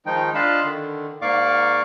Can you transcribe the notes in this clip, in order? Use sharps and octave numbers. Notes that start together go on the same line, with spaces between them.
D#3 F3 G#3 D#4 G5
D4 F4 D#5 F5 A5 B5
D3 D#3
G#2 A#3 D5 F5 C#6 D6